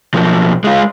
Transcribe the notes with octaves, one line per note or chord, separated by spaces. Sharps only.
B1 F3
G#3 F4